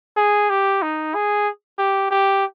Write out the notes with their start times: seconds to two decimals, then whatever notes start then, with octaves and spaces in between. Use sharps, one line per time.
0.17 G#4
0.50 G4
0.82 D#4
1.15 G#4
1.78 G4
2.11 G4